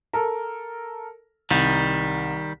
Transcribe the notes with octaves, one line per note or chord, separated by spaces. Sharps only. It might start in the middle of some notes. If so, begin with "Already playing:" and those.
A4 A#4 A#5
C2 D#3 G3